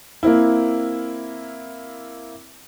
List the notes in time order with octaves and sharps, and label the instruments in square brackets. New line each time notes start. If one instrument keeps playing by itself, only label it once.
[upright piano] A#3 C4 E4